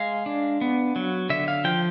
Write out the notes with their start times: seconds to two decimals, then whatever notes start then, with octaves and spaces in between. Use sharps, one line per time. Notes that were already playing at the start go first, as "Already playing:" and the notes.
Already playing: G#3 F5
0.26 D4
0.61 B3
0.96 F#3
1.30 D3 E5
1.48 F5
1.64 F3 G5